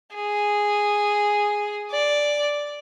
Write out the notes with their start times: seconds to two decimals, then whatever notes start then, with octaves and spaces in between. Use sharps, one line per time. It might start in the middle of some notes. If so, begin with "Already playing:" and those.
0.15 G#4
1.92 D5